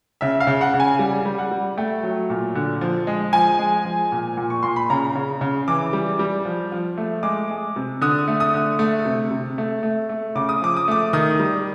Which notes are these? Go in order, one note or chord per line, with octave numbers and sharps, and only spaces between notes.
C#3 E5
F5
C#3
F#5
C#3
G#5
G3
G3
F#5
G3
A3 G5
F#3
A#2
D3
F3
G#3
F3 G#5
G#3
F3
A#2
A#2
C#6
A#2 C6
B5
C#3 A#5
C#3
C#3
E3 D6
G3
G3
F3
F3
A3
G#3 D6
G#3
C3
D3 D#6
A3
D#6
D3
A3
C3
C3
A3
A3
A3
C#3 D6
D#6
F3 D6
D#6
A3 D6
D#3 D#6
G3